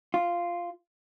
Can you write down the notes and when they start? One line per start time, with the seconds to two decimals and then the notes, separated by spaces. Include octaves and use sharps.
0.14 F4